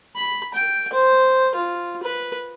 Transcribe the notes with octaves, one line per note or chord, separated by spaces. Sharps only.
B5
G5
C5
F4
B4